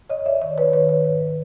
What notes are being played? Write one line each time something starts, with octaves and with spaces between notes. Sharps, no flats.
F2 C#5 D#5
D5 E5
D#3 C#5 D#5
B4 C#5
D#3 B4 C#5
B4 C#5
G#2